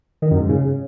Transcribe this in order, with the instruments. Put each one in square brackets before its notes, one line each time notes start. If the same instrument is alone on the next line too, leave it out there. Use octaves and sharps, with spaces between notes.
[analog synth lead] D#3
F#2
G#2
C#3